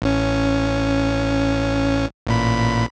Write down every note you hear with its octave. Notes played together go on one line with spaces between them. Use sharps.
A1 C#4
A1 A#2 B5